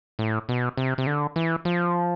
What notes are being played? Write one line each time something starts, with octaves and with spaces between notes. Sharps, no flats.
A2
B2
C3
C3
D3
E3
F3